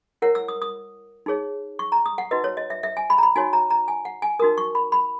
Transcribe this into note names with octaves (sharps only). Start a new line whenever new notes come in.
E4 A#4 C#5 F#5
E6
D#6
D#6
D#4 G#4 C#5
C#6
A#5
D#6
F#5
D#4 F#4 B4 D#5
C#5
D#5
E5
E5
G#5
B5
A#5
B5
D#4 F#4 C#5 G#5
A#5
A#5
G#5
F#5
G#5
D#4 F#4 A#4 D#6
C#6
B5
B5